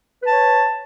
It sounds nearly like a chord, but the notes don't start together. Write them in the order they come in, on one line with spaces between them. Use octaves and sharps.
B4 A5 C#5